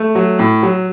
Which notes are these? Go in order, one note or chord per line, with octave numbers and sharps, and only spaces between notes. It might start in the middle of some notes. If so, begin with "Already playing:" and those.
Already playing: A3
F#3
A2
F#3